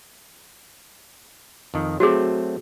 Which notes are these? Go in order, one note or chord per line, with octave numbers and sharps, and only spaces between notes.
F2 D#3
F#3 A3 C4 F#4 G#4